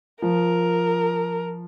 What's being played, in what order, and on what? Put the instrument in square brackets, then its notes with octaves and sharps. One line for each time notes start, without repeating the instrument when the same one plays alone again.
[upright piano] F3 [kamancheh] A#4